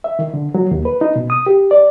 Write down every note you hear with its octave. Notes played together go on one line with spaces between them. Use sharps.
E5
D#3
D3
F#3
D#2
B4
D#4
B2
D#6
G4
D5